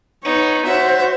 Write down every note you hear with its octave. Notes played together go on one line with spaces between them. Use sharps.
B3 D#4 C#5
F#4 C5 C#5 E5